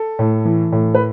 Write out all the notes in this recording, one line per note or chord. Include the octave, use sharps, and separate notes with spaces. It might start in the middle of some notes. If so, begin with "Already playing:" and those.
Already playing: A4
A2
E3
A2
B4